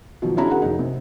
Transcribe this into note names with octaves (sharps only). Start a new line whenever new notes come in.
B2 D#3 F3 F#3
B3 C#4 D4 E4 G#4 A#5
F#4 G#4 A#4 F#5
F1 D#4
C3